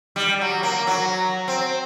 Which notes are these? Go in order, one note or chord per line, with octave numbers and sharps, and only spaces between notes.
G3
F#3
A#3
F#3
C4